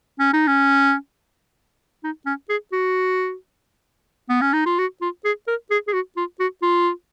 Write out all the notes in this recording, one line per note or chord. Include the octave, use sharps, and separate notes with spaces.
C#4
D#4
C#4
D#4
C#4
G#4
F#4
B3
C#4
D#4
F4
F#4
F4
G#4
A#4
G#4
G#4
F#4
F4
F#4
F4